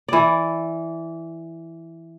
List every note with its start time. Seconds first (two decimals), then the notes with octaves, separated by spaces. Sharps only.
0.08 E3 D5